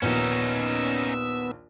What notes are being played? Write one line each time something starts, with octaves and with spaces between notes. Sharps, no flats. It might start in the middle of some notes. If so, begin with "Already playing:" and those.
A#1 D#2 B3 C#4 D#4 E6